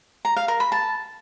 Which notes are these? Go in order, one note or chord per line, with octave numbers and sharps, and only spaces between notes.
A#5
F5
A#4
B5
A5